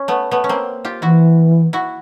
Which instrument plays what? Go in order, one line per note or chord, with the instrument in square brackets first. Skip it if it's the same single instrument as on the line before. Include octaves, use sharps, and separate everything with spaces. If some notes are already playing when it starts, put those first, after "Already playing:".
Already playing: [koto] C#4
A3 B3
A3 B3
C#4
A#3 C4
F4 G4
[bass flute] E3 [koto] E4 F#4
[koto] E4 F#4